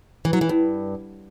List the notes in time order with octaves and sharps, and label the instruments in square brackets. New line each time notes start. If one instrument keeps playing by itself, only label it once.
[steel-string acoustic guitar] E3
F#3
E3
G2